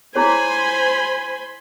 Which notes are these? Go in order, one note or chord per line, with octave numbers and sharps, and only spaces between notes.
E4 G#4 C5 C#5 G#5 B5 C6